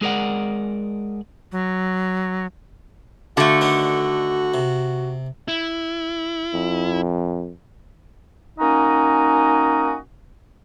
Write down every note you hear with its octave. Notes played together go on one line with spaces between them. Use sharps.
G#3 G#4 A#4 D5 F#5
F#3
D3 A3 F#4 F5 F#5
D#3 B3 D4
C3
E4
F2
A#3 C#4 D#4 F#4 D#5 G#5